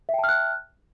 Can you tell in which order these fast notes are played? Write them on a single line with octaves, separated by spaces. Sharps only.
E5 G5 A5 F6 F#6